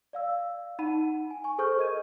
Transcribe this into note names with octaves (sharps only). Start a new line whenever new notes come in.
D5 F5 E6
D#4 F#5 B5 D#7
G#5
G#5 C#6
G#4 A4 C5 C#6 F6 G6
A#4 D#5 G#6 D#7